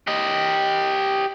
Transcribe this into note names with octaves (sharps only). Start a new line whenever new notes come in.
G4 D#5